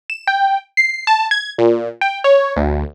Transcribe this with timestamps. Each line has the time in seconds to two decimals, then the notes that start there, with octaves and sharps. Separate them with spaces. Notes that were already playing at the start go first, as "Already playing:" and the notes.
0.10 E7
0.27 G5
0.77 C7
1.07 A5
1.31 G#6
1.58 A#2
2.01 G5
2.24 C#5
2.57 D2